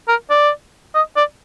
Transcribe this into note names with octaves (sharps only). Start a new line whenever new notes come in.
A#4
D5
D#5
D5